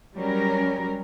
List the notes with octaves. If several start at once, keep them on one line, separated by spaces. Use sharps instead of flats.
F#3 G3 C#4 A#4